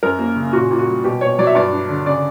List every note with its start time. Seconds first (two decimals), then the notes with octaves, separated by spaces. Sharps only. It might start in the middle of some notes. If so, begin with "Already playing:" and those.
0.03 F#2 A#4
0.19 A#3
0.36 C#3
0.53 A#2 F#4
0.71 A#2
0.79 F#4
0.87 G3
1.04 B2 G4
1.21 B2 C#5
1.38 F#3 D5
1.47 E5
1.55 G2 D5
1.72 D4
1.89 D3
2.06 C#3 D5